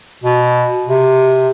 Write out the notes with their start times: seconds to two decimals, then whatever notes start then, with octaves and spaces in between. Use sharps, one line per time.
0.24 B2
0.88 C3